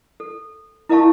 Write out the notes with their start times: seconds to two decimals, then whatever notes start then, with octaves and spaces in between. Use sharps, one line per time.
0.20 A4
0.89 E4 A#4 D#5 F5 A5 C#6